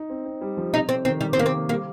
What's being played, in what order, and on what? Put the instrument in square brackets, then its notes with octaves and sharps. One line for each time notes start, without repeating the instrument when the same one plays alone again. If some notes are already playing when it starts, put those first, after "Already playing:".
Already playing: [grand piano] D#4
C4
C4
G3
F3
[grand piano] C3 [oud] D#4
[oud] C4
[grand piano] D#3 [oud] C4
[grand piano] D#3 [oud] G3
[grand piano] C3 [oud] C4
[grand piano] D#3 [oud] A#3
[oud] C4
[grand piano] A#3
[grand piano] G3 [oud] A#3